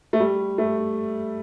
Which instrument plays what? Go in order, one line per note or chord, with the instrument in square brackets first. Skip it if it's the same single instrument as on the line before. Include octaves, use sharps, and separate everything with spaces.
[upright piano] A3
G3
A3